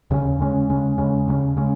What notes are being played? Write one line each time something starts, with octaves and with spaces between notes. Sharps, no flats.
D#2 C#3 G#3 C#4
D#2 C#3 G#3 C#4
D#2 C#3 G#3 C#4
D#2 C#3 G#3 C#4
D#2 C#3 G#3 C#4
C#3 G#3 C#4